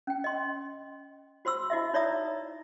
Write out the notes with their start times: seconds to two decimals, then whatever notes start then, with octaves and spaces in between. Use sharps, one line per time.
0.07 C#4 G5
0.24 D#5 C6
1.45 F#4 C5 C6 E6
1.70 E4 F#4 D#5 E5
1.93 D#4 C#5 D5 E5 A#5 D#6